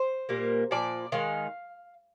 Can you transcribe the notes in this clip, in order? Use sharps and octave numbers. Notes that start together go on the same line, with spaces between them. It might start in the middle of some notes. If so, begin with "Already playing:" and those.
Already playing: C5
A#2 G3 A#3
A#2 F3 D5
D#3 G#3 F5